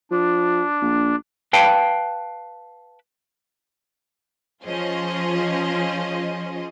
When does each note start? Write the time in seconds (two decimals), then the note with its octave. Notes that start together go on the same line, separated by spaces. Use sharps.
0.11 F3 D4
0.82 A#1
1.53 B4 F5 G5 A5
4.64 F3 C#4 F4 G#4 C5 D#5